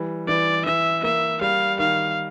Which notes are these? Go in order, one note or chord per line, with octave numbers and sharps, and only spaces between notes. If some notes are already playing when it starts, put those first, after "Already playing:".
Already playing: E3 G3
E3 D5
E3 E5
A#3 E5
G3 F5
D#3 F5